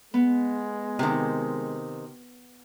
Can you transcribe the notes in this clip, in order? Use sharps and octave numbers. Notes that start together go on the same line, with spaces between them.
G#3 B3
C3 D#3